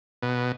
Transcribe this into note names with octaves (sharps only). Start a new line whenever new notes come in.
B2